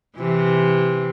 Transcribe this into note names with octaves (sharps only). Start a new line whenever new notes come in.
C3 E3